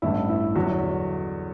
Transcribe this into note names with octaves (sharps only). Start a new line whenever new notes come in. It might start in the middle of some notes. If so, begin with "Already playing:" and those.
A1 G2 E3 E4
E4
E2 D3 F#3 F#4